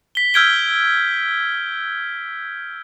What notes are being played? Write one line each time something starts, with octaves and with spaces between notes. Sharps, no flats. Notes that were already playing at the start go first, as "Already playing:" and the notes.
B6 G7
E6 F6 G6 G#6 D7 G7